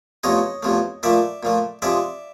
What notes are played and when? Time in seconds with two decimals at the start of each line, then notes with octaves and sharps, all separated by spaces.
0.23 E2 C3 F3 A3 C#5 D#5
0.63 E2 C3 F3 A3
1.03 A#2 F3 A3 D5 E5
1.43 A#2 F3 A3
1.82 C3 F3 G#3 D5 E5